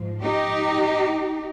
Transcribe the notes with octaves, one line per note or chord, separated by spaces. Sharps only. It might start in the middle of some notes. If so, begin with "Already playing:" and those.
Already playing: G#2 F3
D#4 G4